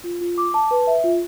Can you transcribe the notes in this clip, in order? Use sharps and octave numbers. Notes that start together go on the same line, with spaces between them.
F4
F4
D6
A5
B4
E5
F4